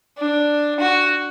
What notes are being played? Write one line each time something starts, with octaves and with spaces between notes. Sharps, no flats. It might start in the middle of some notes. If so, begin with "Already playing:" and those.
D4
F#4